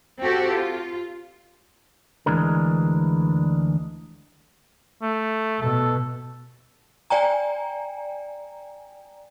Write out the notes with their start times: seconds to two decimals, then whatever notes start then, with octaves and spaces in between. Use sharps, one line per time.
0.20 C4 F#4 G4 A4
0.50 F4
2.26 D2 E3 G#3 D4 A#4
5.02 A3
5.62 B2 A4
7.10 D5 G5 G#5 A#5